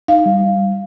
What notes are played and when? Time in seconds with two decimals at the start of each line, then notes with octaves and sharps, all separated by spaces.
0.08 D#4 F5
0.26 G3